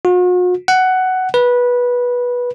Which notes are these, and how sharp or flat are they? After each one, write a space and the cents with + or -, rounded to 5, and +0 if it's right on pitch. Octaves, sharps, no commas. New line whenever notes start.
F#4 -45
F#5 +10
B4 -15